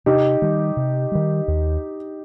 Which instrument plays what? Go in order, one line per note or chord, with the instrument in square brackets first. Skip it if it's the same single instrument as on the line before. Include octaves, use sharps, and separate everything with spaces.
[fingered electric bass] C3 [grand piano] D#4 G4
[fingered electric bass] D#3 G3
C3
D#3 G3
D#2